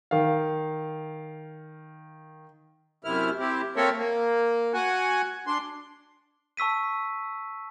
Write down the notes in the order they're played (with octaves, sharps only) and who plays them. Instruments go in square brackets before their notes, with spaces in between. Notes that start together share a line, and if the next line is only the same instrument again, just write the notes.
[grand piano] D#3 F5
[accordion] F#2 C3 E4 F6
C4 E4 G4
A#3 C4 A4 A#4 C#5 E5
A#3
F#4 F#5 G#5
D4 C6
[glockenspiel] A5 C#6 E6 B6 D#7